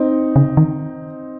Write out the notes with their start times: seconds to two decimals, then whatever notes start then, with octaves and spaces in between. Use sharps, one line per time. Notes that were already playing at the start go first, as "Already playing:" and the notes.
Already playing: C4 D#4
0.36 C#3
0.57 D#3